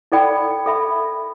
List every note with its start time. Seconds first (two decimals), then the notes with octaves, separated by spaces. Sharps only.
0.12 E4 A4 D5 G5 B5
0.66 A4 E5 B5